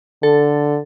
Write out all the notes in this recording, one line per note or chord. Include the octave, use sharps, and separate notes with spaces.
D3 A4